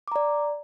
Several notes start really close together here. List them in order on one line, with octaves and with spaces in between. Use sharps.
D6 A#5 D5